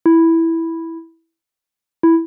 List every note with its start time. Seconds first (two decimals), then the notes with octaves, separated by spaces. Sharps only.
0.06 E4
2.03 E4